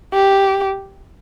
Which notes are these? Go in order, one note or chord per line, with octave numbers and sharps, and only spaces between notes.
G4